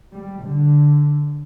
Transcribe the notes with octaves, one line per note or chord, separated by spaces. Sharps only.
G3
D3